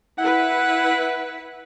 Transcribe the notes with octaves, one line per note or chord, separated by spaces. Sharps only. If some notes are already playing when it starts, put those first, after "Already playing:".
E4 B4 F#5